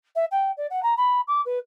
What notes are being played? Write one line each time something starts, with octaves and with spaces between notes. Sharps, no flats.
E5
G5
D5
F#5
A#5
B5
D6
B4